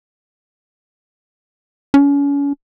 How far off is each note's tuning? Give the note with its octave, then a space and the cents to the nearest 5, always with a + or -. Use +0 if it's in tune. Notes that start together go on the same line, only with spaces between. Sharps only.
C#4 +35